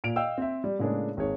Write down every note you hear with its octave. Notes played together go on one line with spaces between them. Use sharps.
A#2 D7 F7
D#5 F5 G5 E6
C4 E5
G3
A2 C#3 G#3 A#3 D4
G#1 G#4 C#5